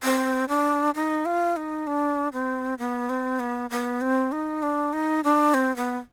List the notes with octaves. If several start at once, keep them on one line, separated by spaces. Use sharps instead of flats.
C4
D4
D#4
F4
D#4
D4
C4
B3
C4
B3
B3
C4
D#4
D4
D#4
D4
C4
B3